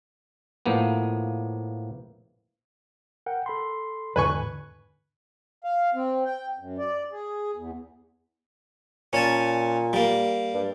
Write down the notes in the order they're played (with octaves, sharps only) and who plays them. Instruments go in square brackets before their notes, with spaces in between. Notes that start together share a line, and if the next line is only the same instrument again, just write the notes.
[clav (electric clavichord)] A2 F3 A#3 B3
[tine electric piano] A#4 F#5 G5
A4 B5 C6
[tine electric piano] E2 G#2 D3 [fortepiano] B4 G#5 C#6
[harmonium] F5
C4
G5
F#2
D5
G#4
E2
[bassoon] A#2 [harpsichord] C#4 G#5 A5
[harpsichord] G3 A#3
[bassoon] G2